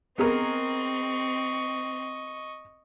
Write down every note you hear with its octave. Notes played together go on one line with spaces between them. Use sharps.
B3 C4 G#4 A#4 D#5 C#6